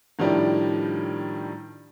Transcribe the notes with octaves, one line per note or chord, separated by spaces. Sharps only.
A2 D#3 F3 G3 D4 E4